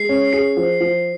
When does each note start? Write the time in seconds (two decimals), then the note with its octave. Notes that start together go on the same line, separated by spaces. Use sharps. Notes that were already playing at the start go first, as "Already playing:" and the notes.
Already playing: G#3 C7
0.09 C#4
0.33 G#4 C7
0.57 F3
0.80 F3